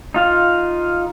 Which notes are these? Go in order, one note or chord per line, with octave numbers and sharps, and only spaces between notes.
D#4 F4 F5